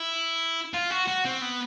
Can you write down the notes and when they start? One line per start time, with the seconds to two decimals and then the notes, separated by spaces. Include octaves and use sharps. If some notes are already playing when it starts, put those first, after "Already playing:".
Already playing: E4
0.74 F4
0.90 F#4
1.07 F#4
1.25 C4
1.42 B3